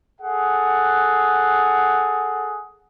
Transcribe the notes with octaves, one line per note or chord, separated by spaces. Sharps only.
G#4 A4 F#5